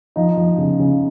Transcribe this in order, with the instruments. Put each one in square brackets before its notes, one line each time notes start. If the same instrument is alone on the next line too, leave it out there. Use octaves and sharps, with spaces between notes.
[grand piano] F3 D#4
F3
C#3
C#3